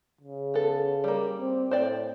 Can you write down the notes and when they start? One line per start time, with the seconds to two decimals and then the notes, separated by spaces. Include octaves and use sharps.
0.21 C#3
0.54 B3 A4
1.04 G3 A#3
1.40 C4
1.71 A2 C5 D5 G5